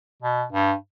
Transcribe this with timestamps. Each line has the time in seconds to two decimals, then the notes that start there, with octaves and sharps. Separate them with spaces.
0.23 B2
0.53 G2